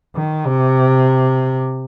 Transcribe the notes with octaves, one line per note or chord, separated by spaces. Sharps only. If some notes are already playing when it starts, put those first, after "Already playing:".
D#3
C3